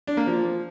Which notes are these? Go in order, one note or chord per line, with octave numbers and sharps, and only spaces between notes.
D4
A#3
F3